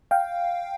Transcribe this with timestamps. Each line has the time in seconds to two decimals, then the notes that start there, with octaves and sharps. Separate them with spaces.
0.11 F5 G5